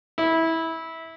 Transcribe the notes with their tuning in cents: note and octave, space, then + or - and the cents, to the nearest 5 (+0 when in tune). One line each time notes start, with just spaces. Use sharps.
E4 -15